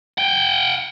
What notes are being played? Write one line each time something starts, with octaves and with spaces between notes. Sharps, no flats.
F#5 G5